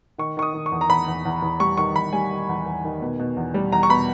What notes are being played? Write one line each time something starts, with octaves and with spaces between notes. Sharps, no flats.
D#3 C#6
D#3 C#6
D#6
D#3
C#6
E2
A#5
E2 B5
E2
E2
E2
G3 C#6
D#3 C#6
E2 B5
G3 G#5
D#3
E2
E2
D#3
B2
B2
E2
G3
E2 A#5
C#6
B2 B5